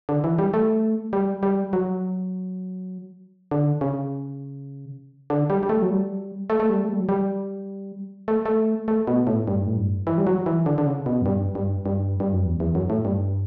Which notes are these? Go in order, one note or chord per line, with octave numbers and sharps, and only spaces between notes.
D3
E3
G3
A3
G3
G3
F#3
D3
C#3
D3
G3
G3
A3
F#3
G3
A3
A3
G3
A3
G3
F#3
G3
A3
A3
A3
B2
A2
G2
A2
G2
E3
G3
F#3
E3
D3
D3
C#3
B2
F#2
G2
G2
G2
G2
F#2
E2
E2
F#2
A2
G2